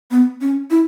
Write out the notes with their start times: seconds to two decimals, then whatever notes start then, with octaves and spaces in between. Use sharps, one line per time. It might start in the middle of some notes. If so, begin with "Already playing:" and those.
0.11 B3
0.41 C#4
0.71 E4